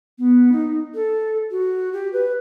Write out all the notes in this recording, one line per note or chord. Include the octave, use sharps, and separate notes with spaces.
B3
D#4
A4
F#4
G4
B4